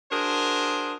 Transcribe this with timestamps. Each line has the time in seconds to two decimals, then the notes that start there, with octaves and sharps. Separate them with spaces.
0.12 D4 F#4 G#4 A#4 C5